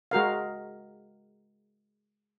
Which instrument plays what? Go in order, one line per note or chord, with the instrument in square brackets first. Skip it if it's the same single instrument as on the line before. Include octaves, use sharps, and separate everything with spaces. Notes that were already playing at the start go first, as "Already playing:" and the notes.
[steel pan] G#3 F#4 A#4 F5